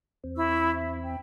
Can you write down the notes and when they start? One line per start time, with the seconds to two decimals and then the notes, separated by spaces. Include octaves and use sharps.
0.24 E2 C4
0.36 E4 C#6 E6
0.74 E5
1.04 G5